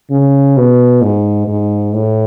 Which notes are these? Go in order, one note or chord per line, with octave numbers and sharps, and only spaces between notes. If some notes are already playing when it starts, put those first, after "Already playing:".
C#3
B2
G#2
G#2
A2